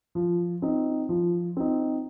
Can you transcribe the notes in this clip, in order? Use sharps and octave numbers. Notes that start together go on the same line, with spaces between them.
F3
C4 D#4
F3
C4 D#4